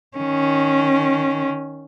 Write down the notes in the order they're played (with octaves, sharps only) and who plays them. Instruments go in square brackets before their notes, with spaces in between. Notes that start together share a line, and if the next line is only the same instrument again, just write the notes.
[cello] D#3 C#4